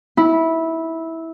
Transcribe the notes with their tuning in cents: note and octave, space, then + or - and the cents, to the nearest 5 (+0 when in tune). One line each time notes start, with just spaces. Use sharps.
E4 -15